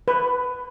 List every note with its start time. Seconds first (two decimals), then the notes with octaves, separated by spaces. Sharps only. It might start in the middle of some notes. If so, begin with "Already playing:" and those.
0.08 B4